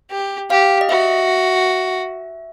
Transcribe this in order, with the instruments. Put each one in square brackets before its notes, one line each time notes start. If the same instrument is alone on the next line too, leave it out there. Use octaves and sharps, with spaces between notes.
[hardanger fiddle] G4
[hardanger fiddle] G4 [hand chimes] F5
[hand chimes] D#5
[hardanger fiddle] F#4 [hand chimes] E5